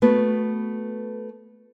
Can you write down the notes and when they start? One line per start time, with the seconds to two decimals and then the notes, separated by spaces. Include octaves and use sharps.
0.02 A3 B3 F#4 B4